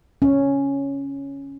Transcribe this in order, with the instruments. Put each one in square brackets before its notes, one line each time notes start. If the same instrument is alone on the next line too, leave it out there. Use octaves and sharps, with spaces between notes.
[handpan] C#4